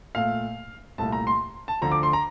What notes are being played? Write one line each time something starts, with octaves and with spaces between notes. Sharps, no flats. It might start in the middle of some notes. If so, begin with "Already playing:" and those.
A#2 A3 F5
C2 A#2 A3 A5
A#5
C6
A5
D2 D3 F3 A#5
D6
C6
A#5